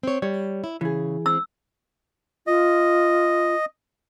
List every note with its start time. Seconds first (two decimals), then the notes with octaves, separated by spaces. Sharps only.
0.03 C4 C#5
0.22 G3 C#5
0.64 E4
0.81 C#3 E3 G#4
1.26 C4 E6
2.47 F4 D#5